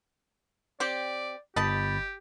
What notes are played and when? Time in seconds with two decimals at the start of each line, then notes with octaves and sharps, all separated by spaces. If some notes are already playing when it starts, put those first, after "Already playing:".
0.80 C4 G4 D5
1.56 G1 G4 D#5 A5 B5 A6